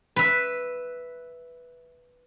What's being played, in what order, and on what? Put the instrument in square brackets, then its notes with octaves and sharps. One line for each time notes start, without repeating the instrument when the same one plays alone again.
[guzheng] B4 E5